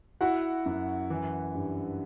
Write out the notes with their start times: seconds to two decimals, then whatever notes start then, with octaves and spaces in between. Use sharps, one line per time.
0.21 E4 F#4 F#5
0.66 F#2
1.10 E3
1.55 G2